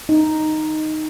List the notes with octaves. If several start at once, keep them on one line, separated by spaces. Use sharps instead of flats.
D#4